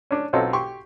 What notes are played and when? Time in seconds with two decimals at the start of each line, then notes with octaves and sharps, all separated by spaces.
0.11 C#4 D4
0.33 B1 C4 C#4 F4 A4 D#5
0.53 G4 C6 C#6